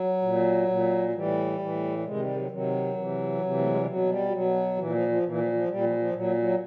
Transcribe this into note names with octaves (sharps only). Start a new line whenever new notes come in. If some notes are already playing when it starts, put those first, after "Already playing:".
Already playing: F#3
A#2
A#2
F#3
A2 E3 G3
A2 E3
G3
C3 D#3 G#3
G3
F#3
C3 D#3 F#3
C3 E3
C3 E3
A3
G#3
G3
B2 F#3
G3
B2 F#3
A#2 E3
F3
F3
A#2 E3
F3
F3
A#2 G3
F3
F3
A#2 F#3
F#3